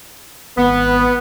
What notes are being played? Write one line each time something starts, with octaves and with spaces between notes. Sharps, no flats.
G#1 B3